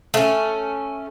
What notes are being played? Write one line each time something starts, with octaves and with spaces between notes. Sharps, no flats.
A3 C#4